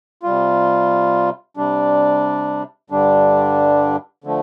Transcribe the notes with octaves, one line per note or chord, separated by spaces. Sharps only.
C3 G3 F4
C3 G3 D4
G2 D3 G3 D4
D3 F3 A3